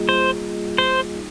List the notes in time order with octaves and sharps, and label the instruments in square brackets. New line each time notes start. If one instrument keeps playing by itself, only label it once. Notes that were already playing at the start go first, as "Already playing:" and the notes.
Already playing: [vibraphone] G3 A#3 F4 G#4 D#5
[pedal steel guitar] C5
C5
[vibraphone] D#4